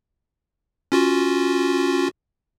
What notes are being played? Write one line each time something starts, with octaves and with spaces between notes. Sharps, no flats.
C#4 F4 F#4